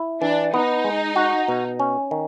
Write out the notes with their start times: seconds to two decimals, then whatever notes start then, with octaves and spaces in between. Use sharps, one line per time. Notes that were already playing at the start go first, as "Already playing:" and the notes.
Already playing: E4
0.21 E3 D4
0.53 B3 D#4
0.84 G#3
1.16 F#4
1.48 B2
1.80 C#4
2.11 D#3